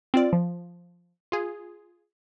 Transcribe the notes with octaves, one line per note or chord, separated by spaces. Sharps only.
C4 F4 D5
F3
F4 G#4